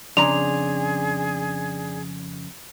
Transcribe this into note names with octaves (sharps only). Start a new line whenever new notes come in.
F2 C#3 D4 G#4 D5 A#5 C6 F7